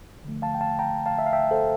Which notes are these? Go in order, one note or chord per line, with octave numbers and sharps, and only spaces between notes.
D3 F3 A3
F5 A5
G5
F5 A5
G5 A#5
F5 A5
E5
F5
E5 G5
A4 C5